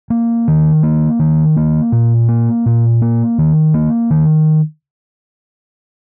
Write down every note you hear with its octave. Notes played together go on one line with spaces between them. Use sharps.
A#3
D#3
A#3
D#3
A#3
A#2
A#3
A#2
A#3
D#3
A#3
D#3